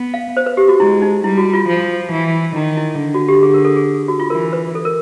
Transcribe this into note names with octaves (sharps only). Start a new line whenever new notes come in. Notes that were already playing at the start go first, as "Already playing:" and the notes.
Already playing: B3
F5
C5
B4
G4
F#4
G#3 E4
D#4
G3 E4
F#4
F4
F3
E3
D#3 E4
E4
D3
F#4
G4
G#4
A#4
A4
G#4
F#4
F4
E3 A#4
B4
A4
A#4